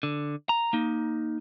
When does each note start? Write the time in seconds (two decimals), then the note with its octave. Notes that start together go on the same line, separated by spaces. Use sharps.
0.03 D3
0.49 A#5
0.73 A#3 D#4